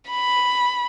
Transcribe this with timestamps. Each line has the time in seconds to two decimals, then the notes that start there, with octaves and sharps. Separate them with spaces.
0.10 B5